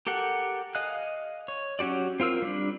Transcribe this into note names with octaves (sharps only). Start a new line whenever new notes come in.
G4 A4 A#4 F#5
D#5 F5 G#5 F#6
C#5
F#3 C#4 F#4 G4 D5
C4 F4 A#4 E6
G3 D4